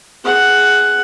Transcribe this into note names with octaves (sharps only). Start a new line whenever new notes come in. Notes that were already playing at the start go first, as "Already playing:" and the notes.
G#4 F#5